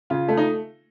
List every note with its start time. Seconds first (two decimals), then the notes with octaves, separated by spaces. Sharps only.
0.10 C#3 F4
0.28 A3
0.37 D#4